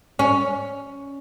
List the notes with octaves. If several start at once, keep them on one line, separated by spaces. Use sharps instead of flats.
C#4